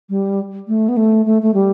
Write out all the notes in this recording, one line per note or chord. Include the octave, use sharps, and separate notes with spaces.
G3
A3
B3
A3
A3
A3
G3